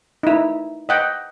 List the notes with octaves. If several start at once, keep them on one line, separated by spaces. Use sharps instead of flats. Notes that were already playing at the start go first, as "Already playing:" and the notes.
D#4 E4
D#5 F#5 G5